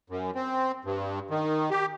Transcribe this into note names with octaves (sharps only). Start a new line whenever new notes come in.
F#2
C4
G2
D#3
G4